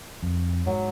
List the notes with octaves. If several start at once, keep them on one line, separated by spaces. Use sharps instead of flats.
F2
G#2 F#3